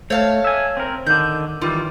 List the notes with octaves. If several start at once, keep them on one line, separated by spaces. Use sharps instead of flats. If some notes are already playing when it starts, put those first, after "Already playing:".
A3 C#5 F5 A5
E5 G#5
C4 A#4
D3 D#3 G6
D#3 E3 G3 F4